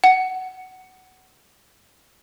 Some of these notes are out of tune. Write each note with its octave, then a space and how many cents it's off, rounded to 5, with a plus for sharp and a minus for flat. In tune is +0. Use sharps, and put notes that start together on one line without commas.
F#5 +15